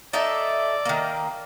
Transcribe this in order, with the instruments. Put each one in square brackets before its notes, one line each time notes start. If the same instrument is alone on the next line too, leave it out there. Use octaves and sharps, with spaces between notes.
[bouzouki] D#4 A4 E5 [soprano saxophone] D5
[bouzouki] D#3 A#3